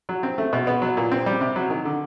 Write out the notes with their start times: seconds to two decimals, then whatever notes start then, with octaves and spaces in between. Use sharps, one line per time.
0.09 F#3
0.23 C4
0.38 A3
0.53 B2
0.67 B3
0.82 F#3
0.97 A#2
1.11 C4
1.26 G3
1.41 C3
1.56 F#3
1.70 D#3
1.85 D3